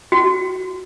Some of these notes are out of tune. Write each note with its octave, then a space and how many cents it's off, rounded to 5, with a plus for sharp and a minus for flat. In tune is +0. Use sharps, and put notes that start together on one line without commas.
F#4 +10